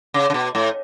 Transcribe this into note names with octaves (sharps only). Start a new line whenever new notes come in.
C#3
C#3
B2
A2